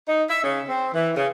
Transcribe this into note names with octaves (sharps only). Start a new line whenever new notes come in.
D#4
E5
C#3
C4
E3
C#3